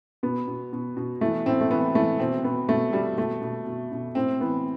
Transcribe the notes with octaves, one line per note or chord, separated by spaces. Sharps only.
B2 B3
B2
B2
B2
E3 A3
A2 C4
A3
E3 B3
E3 A3
B2 C4
B2 B3
B2 A3
B2 G3
B2 A3
B2
B2
B2
A2 C4
E3 B3